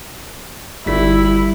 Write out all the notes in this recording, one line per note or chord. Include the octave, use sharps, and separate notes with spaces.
G1 G3 E4 B6